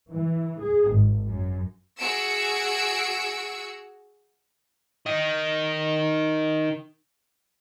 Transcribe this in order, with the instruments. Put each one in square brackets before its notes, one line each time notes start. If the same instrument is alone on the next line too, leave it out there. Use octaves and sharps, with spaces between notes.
[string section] E3
G#4
G#1
F#2
[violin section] F#4 G#4 E6 C#7 D7
[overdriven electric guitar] D#3 D#4